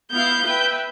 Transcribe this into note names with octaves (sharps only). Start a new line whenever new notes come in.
B3 E4 F5 G6
B4 E5 G5